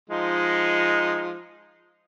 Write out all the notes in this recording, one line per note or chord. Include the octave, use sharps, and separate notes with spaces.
F3 G#3 D#4